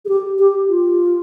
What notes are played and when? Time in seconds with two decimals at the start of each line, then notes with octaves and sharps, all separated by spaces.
0.05 G#4
0.09 G4
0.39 G4
0.69 F4